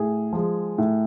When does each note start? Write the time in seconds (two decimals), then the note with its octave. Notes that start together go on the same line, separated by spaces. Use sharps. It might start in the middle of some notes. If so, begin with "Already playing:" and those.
Already playing: A2 G#4
0.33 F3 G#3
0.78 A2